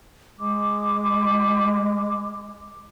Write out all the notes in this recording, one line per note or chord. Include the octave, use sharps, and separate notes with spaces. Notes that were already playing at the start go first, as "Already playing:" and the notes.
G#3 D6